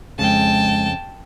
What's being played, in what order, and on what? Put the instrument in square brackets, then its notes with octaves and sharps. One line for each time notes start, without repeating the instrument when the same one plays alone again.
[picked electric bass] F2 C#3 [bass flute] G#3 [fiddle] G5 A5